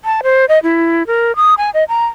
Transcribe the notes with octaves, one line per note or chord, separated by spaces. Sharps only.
A5
C5
D#5
E4
A#4
D#6
G#5
D#5
A#5